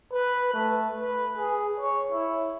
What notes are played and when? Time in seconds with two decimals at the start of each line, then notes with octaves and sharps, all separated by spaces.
0.13 B4
0.54 A3
1.00 B4
1.37 G#4
1.80 C#5
2.12 E4